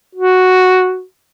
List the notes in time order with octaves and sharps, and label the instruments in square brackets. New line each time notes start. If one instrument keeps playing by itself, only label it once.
[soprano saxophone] F#4